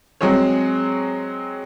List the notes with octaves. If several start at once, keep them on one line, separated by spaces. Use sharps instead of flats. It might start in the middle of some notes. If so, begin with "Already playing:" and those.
F#3 G#3 C4 G#4 C#5